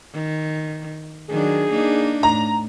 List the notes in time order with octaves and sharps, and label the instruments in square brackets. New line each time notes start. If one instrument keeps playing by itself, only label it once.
[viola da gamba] D#3
[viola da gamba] D#3 F#3 D4 [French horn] G#4
[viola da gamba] A#3 D4 D#4
[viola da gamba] A2 [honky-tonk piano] A#5